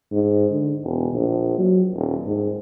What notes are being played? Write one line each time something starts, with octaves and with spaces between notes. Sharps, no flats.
G#2
D3
E1
A#1
F#3
D#1
G#2